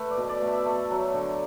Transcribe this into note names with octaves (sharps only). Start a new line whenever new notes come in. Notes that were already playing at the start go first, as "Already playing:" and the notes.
Already playing: A3 B4
D5
B2
D5
A3
E5
A3
F#3
D3